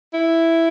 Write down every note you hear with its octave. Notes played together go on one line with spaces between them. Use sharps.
E4